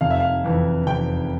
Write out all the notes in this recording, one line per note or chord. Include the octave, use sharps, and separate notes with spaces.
F1 F5
E5
F5
F2 E3
F1 G5